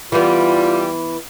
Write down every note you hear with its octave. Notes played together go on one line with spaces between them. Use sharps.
E3 G3 B3 F4